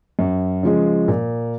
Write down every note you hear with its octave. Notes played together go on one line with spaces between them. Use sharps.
F#2
C#3 F3 G#3
A#2